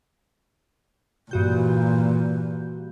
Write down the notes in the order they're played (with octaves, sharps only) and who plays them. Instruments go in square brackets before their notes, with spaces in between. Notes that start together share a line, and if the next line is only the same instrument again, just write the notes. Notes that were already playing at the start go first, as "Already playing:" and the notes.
[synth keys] G2 F#4 G6 [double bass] A#2 E3